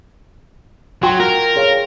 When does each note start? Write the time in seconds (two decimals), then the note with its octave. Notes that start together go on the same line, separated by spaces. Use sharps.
1.03 F#3 F4 G5 C6
1.20 A#4
1.56 G#4 C#5 F5